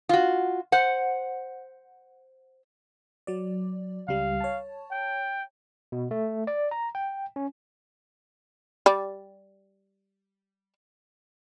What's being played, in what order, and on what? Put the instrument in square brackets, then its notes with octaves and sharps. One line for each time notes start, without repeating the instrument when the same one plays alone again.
[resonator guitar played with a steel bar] F4 F#4
C5 F#5
[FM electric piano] F#3 D5
[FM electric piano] C#2 G3 [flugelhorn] F5
[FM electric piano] C#5 A5
[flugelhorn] G5
[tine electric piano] B2
A3
D5
A#5
G5
C#4
[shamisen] G3 D5